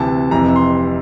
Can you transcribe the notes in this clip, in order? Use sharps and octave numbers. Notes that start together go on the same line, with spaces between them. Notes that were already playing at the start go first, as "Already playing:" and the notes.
Already playing: D2 C3 E3 A5
F1 F2 C3 E3 A#5
C6